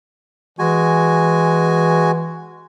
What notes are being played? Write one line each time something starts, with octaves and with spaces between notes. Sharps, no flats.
E3 G#3 F#4 G#5